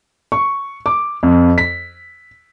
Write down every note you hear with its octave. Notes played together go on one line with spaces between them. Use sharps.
C#6
D6
F2
B6